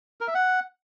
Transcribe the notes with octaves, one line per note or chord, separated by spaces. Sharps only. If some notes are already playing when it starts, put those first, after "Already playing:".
A#4
E5
F#5